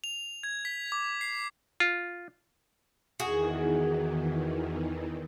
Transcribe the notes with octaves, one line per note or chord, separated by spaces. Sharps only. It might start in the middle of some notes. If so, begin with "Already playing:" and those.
F7
G#6
B6
D6
C7
F4
E2 D#3 E3 F#4 G#4